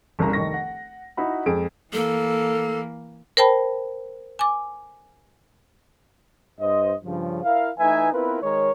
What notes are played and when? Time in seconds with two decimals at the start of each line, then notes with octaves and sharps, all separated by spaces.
0.19 G1 C2 C#3 G#4 A#5
0.33 F1 D#3 C#6 A#6
0.54 F#5
1.17 D#4 E4 F#4 B5
1.46 F2 G#3 G#4 D7
1.93 E3 A#3 A4
3.37 A#4 C5 G5 A5 B5
4.39 G#5 D6
6.61 G2 C5 D#5
7.05 G2 C#3 F3
7.44 E4 A#4 E5 F5
7.79 E3 A3 D#4 B4 E5 G#5
8.13 B3 C4 E4 F4 A#4 B4
8.43 D#3 G#3 A#4 C#5